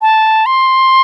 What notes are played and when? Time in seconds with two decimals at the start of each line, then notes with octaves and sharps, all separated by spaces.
0.02 A5
0.46 C6